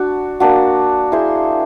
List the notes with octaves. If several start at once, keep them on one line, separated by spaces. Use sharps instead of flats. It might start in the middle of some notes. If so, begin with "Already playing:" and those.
Already playing: D4 F#4
A#3 D4 F#4
E4 G#4 C5